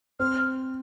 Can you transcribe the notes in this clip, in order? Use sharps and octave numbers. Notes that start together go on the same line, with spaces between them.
C4 F6